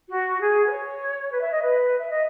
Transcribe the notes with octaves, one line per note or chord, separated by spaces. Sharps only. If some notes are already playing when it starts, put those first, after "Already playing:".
F#4
G#4
B4
C#5
B4
E5
D#5
B4
E5
D#5